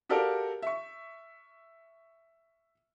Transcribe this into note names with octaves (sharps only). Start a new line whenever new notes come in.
F#4 G4 A4 A#4 D5 F5
E5 C#6